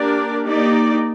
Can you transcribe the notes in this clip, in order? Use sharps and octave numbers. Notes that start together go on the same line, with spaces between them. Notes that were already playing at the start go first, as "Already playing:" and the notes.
Already playing: A#3 D4 G4 A#4 D5
A#3 D#4 G4 D5